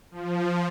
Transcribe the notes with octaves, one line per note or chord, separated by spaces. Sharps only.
F3